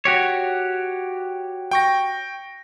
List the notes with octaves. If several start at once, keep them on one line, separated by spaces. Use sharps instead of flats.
F#4 G4 C#5
G5 C#6 A#6